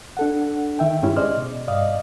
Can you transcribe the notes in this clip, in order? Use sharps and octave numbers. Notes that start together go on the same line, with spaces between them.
D4 A4 F#5
D#3 E5 G5
G2 G#3 C#4 E4 G4
C#4 G#4 C5 D5 D#5 F6
B2
G2 D5 D#5 F5 D#6